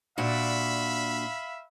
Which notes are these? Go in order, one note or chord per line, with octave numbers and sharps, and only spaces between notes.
A#2 D4 F#4 E5 F5 B5